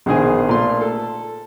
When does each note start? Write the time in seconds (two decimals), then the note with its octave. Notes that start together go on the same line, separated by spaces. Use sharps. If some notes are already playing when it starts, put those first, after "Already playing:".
0.06 A#1 B2 D#3 G#4 C5 G#5
0.49 A#2 A3 C6
0.81 A4